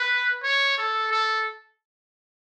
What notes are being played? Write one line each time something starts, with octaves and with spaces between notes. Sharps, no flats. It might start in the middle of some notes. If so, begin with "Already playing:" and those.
Already playing: B4
C#5
A4
A4